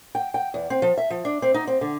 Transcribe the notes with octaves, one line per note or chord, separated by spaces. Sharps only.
G5
G5
E2
C4
F3
E5
F3
D4
C4
D#4
C4
D3